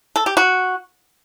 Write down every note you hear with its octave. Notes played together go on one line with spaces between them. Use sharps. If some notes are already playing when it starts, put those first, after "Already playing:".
A4
G4
F#4